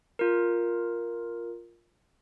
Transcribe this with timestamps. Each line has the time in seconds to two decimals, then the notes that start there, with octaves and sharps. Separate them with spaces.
0.19 F4 A#4